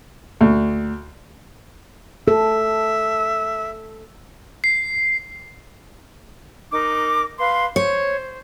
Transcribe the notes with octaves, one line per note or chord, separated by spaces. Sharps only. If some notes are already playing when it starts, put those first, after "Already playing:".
D2
A4 E5
C7
D#4 A#4 D6
B4 F5 C6
C5 C#5